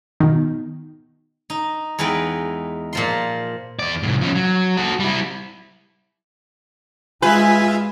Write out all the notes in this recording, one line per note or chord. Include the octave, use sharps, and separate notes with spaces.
B2 D#3
D#4
E2 G#3 D#4 B4 G5
A#2 F3 C6
E2 D5
C2 A2
F3 C#4
F#3
F#4 A4
G3 E4
G#3 F4 B4 E5 G#5